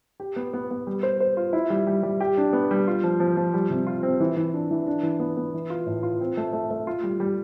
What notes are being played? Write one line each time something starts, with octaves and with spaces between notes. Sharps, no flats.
G4
B3
B3
B3
G3
C5
C5
F4
E4
G3
G3
G3
G4
D4
B3
G3
F4
F3
F3
F3
G3
C3
F4
C4
E3
E3
D4
E3
D4
E3
B3
B3
E3
F4
A2
F4
C4
A3
A3
A3
F4
G3
G3